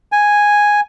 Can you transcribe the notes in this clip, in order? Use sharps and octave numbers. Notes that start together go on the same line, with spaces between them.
G#5